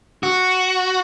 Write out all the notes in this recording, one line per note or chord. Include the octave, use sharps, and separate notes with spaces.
F#4